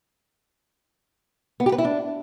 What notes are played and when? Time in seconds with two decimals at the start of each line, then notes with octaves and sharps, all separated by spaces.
1.60 B3
1.66 G4
1.72 B4
1.78 E4
1.85 D4